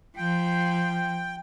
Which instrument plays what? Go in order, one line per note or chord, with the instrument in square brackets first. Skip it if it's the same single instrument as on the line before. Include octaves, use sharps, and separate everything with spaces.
[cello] F3 [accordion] G5